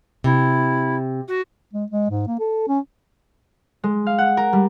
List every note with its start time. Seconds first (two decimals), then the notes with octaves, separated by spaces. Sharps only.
0.24 C3 E4
1.28 F#4
1.74 G#3
1.91 G#3
2.10 G#2
2.28 A#3
2.39 A4
2.68 C#4
3.84 G#3
4.06 F5
4.18 F#5
4.37 A#4
4.53 G3